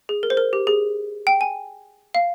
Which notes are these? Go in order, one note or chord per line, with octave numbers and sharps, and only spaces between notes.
G#4
A#4
C5
A#4
G4
G#4
G5
G#5
F5